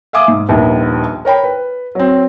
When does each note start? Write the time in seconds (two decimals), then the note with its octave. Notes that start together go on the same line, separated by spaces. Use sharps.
0.13 E5 F5 G#5 D6 D#6
0.28 G#2
0.49 D#1 A#1 D#2 D#3 B3
1.25 A#4 C#5 G5 B5
1.44 B4
1.95 F#3 C4